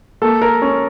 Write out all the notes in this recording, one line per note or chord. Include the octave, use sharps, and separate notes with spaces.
A#3 A4
A#4
C#4